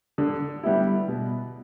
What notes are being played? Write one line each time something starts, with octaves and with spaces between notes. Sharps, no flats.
D3
G3 B3 E4
B2